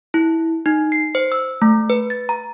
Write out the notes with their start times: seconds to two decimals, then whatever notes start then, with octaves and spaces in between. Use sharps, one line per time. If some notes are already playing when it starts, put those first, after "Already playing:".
0.14 E4
0.66 D#4
0.92 C7
1.15 C5
1.32 E6
1.62 A3
1.90 B4
2.10 A6
2.29 A#5